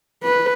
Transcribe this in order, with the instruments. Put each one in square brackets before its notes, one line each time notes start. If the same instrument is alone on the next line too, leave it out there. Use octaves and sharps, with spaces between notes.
[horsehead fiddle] B4